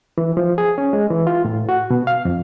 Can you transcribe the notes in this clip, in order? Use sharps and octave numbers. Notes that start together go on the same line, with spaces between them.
E3
F3
G#4
C#4
G#3
E3
F4
A2
F#4
B2
F5
F2